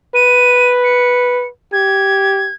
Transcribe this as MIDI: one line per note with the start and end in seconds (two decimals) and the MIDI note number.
0.15 1.48 71
0.15 0.72 99
0.84 1.47 97
1.73 2.50 67
1.73 2.54 92